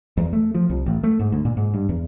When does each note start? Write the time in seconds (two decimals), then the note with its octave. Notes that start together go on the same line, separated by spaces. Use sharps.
0.17 E2
0.33 A3
0.54 F3
0.69 C2
0.86 A1
1.03 A3
1.19 G#2
1.32 D2
1.45 A#2
1.57 G#2
1.74 G2
1.89 E2